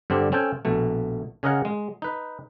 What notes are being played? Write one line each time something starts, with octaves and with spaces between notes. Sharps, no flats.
G2 D3 C4 D4
C4 C#4 A4 G5 G#5
A#1 B2 A3
C#3 C#4 G#4 A#4 D#5 F#5
G#3
D#4 B4